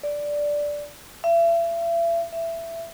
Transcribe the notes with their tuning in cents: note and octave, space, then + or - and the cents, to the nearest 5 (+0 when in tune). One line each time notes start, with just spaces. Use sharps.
D5 -5
E5 +40
E5 +15